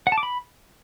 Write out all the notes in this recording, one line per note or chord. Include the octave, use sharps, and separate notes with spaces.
F#5
A5
D6
B5